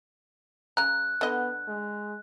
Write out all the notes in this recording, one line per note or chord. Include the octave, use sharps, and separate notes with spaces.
C#3 A#5 F#6
D3 B3 D#5
G#3